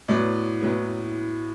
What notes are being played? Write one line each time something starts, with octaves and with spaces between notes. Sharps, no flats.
A2 F#3 B3 D5
A2 F#3 B3